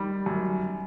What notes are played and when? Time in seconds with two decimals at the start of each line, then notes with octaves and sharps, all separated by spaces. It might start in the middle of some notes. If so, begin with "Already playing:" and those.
Already playing: D#3 G3
0.26 F#2